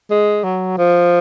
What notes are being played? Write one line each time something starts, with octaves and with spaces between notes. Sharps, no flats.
G#3
F#3
F3